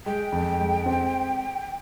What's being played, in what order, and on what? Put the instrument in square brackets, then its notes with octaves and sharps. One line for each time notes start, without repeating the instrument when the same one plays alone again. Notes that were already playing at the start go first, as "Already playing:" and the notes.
[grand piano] G#3 [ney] G5
[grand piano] F2
G#3
C4